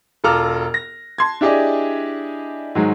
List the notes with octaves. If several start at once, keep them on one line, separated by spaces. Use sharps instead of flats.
E1 F4 A4 A#5 D6 F6
A#6
A5 C6 G#6
D4 E4 G4 G#4 D5 D#5
G#2 D#3 F#3 G#3